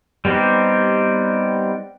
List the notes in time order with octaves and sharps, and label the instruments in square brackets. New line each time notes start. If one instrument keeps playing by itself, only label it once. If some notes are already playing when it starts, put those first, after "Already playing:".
[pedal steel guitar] G3 B3 C4 D#4 G4